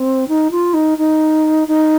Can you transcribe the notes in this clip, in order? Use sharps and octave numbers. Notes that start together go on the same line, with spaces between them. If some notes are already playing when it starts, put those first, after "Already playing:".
Already playing: C4
D#4
F4
D#4
D#4
D#4